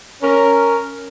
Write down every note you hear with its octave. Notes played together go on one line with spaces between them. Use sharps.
C#4 A#4